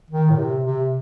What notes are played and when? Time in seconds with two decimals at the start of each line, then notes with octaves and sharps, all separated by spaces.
0.11 D#3
0.30 A2
0.38 C3
0.64 C3